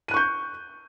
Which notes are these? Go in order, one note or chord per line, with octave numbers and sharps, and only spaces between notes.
C#6 F#6 G6 D#7